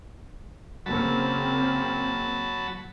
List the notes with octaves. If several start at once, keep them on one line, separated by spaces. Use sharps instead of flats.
C#3 F#3 A#3 C4 A5 B5